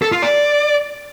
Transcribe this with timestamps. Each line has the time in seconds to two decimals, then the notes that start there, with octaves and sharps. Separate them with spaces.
0.02 A4
0.12 F4
0.22 D5